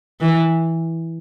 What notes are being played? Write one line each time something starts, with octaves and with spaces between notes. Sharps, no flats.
E3